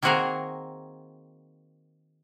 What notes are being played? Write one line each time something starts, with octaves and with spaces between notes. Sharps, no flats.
D#3 A#3 C4 F#4 G#4 A#4